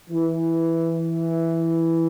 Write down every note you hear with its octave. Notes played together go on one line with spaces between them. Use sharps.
E3